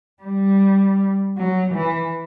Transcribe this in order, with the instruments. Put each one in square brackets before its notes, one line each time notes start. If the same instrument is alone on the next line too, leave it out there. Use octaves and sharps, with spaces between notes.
[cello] G3
F#3
E3